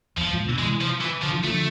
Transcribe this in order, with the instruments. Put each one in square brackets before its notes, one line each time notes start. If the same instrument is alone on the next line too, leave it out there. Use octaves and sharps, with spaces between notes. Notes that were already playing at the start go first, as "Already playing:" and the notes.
[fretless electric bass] E2 [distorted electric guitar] F3
[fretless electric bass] E2 G#2
B2 D3
[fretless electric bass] C3 E3 [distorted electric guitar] G#3
[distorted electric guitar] F3
E3
[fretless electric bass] D3 [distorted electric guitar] F3
[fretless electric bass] E3
[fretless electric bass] D3 F3 [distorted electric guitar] A3